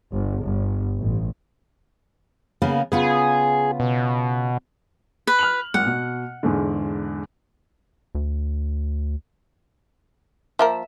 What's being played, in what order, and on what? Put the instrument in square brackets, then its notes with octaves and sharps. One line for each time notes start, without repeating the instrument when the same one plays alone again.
[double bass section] G1
G1
A1
[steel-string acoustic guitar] C#3 A#3 B3
[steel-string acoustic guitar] C#3 B3 F4 [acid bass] G#4
[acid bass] B2
[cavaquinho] B4
[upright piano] F6 F7 F#7
[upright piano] G#1 [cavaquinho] F#5
[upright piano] B2
E2 G#2 D3
[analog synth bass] D2
[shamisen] F3 A#3 A#4 [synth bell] E5